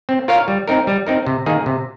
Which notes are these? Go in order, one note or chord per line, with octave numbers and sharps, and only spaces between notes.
C4
F4 A#4 C#5 F5
G3
C4 D#4 A#4
G3
C4 D#4 A#4
C3
D#3 A#3 D#4 G#4
C3